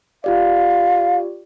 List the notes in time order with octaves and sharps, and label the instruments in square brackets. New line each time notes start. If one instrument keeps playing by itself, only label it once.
[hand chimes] F4 G4 D5 [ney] F5